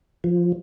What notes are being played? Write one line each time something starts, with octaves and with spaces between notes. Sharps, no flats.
F3